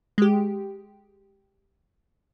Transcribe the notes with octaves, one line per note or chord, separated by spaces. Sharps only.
G#3 G4